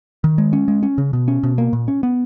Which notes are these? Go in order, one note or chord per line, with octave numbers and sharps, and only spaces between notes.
D#3
G#3
C#4
G#3
C#4
C#3
B2
C#4
B2
A#3
A#2
C#4
B3